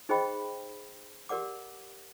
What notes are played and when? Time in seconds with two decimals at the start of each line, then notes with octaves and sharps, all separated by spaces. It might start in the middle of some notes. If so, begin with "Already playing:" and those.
0.09 D#4 G#4 C5 D#5 G5 B5
1.29 G4 A#4 D5 F#5 D6